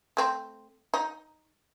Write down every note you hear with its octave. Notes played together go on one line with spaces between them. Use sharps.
A3 C4
D#4